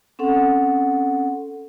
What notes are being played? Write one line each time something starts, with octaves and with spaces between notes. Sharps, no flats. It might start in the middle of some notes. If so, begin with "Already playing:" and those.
C4 C#4 A4 F#5